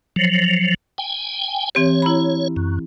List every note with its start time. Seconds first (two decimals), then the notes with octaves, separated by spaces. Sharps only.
0.16 F3 F#3
0.98 G5 G#5
1.75 E3 C4 G4 C#5
2.02 E4 A#5 B5
2.56 F#2